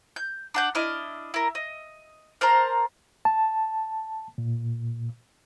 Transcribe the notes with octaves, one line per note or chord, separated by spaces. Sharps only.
G6
D4 F#5 G6
D4 E4 D#5 F6
E4 A#4
D#5
A#4 C5 A5 A#5
A5
A#2